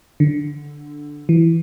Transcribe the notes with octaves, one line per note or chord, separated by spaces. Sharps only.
D3
E3